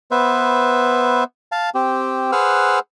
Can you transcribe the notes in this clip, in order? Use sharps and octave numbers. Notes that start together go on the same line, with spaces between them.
B3 B4 C5 E5
F5 A5
C4 G4
G#4 B4 C5 F#5 E6 F6